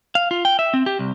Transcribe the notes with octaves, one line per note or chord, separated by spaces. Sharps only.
F5
F4
G5
E5
C4
G4
C2